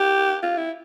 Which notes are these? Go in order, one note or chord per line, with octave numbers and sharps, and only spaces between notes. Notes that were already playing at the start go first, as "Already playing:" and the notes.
Already playing: G4
F4
E4